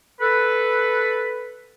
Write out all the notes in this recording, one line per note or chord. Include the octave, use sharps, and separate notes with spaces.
A4 B4